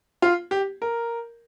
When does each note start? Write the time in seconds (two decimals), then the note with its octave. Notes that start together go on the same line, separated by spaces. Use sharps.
0.22 F4
0.51 G4
0.82 A#4